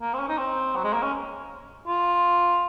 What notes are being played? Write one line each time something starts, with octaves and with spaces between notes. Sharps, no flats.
A#3
C4
C#4
D#4
C4
F#3
G#3
A#3
C#4
F4